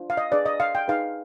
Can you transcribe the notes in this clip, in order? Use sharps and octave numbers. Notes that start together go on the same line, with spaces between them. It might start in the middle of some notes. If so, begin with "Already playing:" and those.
Already playing: D4 F4 C5
F5
D#5
D4 G#4 B4 D5
D#5
F5
G5
D#4 G#4 B4 F5